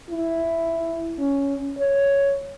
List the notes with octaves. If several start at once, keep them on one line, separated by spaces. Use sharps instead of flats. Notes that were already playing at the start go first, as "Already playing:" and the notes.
E4
C#4
C#5